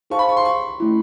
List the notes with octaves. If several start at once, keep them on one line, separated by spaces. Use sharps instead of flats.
D#4 G#4 C5 F5 A5 C#6
B5
C#6
C6
C#6
A3 C#4 E4